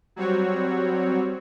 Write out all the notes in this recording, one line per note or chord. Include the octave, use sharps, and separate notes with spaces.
F#3 G3 C4 F#4 C#5